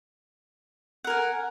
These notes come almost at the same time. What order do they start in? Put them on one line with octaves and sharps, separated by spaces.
F#5 A#4 G#5